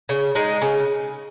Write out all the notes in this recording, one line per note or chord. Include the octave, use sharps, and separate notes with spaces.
C#3
G#3 D#4
C#3